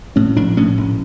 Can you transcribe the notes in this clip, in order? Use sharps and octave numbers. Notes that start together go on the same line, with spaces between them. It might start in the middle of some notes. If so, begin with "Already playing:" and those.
A2 C#4
A#1 D4
A2 C#4
A#1